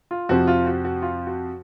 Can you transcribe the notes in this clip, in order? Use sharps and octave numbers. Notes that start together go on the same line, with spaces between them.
F4
F2 C3 F3 F#4
F4
F#4
F#4
F4
F#4